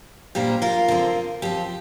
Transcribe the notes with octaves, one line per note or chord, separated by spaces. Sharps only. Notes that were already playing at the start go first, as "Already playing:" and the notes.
A#2 G3 A#3 D4 G4 C5
F4 A#4
D3 F3 C4
F3 C4 G4